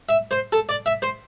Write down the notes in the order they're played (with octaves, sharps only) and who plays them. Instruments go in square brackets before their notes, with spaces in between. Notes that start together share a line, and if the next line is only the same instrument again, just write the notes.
[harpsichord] E5
C5
A4
D5
E5
C5